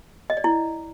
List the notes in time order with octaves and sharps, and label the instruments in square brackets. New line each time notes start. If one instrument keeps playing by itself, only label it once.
[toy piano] D#5
D5
E4